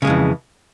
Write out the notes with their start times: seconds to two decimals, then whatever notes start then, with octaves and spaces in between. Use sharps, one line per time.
0.02 C#3
0.05 G#3
0.07 F2
0.10 E3